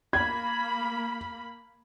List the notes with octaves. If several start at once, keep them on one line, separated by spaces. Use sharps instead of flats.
A#3 B5 G#6